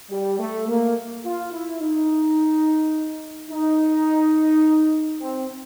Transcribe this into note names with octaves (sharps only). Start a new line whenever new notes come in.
G3
A3
A#3
F4
E4
D#4
D#4
C4